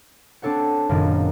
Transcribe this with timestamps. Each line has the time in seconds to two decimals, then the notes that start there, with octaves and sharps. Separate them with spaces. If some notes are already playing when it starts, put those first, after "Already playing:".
0.42 C4 D4 A4 C#5 F#5
0.89 F#1 F#2 A#2 D#3 D#4 A6